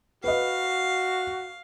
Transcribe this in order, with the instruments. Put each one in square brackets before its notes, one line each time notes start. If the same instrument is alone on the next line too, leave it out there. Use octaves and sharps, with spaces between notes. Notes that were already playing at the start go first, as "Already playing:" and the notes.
[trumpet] F#4 [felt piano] B4 D#5 [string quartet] F5